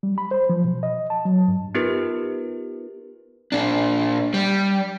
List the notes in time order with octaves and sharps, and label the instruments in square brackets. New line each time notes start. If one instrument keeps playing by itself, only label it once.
[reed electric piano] G3
B5
C5
F3
B2
D#5
A5
F#3
G2
[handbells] B3 D#4 F4 G4 A#4 B4
[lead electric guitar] A#2 D4
G3